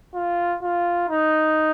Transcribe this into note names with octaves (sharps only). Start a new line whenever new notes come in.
F4
F4
D#4